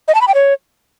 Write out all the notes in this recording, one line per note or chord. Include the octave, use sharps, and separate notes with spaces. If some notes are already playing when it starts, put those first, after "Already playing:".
D#5
A5
B5
G5
C#5